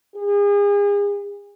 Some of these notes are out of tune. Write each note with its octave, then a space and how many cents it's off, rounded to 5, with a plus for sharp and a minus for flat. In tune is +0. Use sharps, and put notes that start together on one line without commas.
G#4 -35